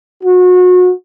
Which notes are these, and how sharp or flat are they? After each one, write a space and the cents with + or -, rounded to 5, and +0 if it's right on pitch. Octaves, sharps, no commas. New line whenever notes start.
F#4 -30